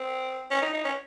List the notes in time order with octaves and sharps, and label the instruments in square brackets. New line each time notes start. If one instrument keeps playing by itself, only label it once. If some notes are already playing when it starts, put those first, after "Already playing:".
Already playing: [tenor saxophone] C4
C#4
D#4
D#4
C#4